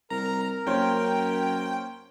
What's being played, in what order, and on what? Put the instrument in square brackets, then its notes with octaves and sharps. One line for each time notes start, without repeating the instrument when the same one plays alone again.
[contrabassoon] C2 [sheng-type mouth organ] A#4 [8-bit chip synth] A#5
[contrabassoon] F#2 [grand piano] A#3 C#4 C5 [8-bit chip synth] G5